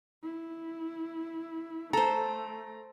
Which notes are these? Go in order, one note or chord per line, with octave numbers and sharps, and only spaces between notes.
E4
A3 A4 C5 A#5